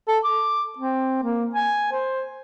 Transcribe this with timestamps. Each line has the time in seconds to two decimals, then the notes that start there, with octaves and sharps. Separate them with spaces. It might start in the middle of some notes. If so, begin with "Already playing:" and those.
0.08 A4
0.24 D6
0.78 C4
1.23 A#3
1.55 G#5
1.92 C5